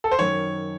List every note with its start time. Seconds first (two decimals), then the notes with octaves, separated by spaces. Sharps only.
0.04 A4
0.12 C5
0.19 F#2 D#3 C#5